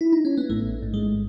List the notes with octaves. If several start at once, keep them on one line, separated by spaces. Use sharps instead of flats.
E4
D#4
C#4
B3
A1 A2 A3
G#2
G#3